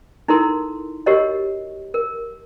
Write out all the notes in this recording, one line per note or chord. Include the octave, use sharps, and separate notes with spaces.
D#4 E4 A4 A#4 C6
F#4 G4 A#4 C#5 D#5
A#4